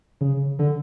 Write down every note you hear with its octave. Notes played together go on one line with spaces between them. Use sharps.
C#3
D3